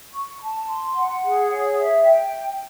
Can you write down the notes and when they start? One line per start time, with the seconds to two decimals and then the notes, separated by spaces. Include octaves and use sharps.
0.14 C#6
0.41 A5
0.68 C6
0.95 F#5
1.22 G#4
1.50 C#5
1.76 E5
2.04 G5